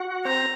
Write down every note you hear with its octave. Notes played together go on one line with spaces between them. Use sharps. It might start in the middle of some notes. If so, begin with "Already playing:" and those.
Already playing: F#4 F#5
C4 C5 A#5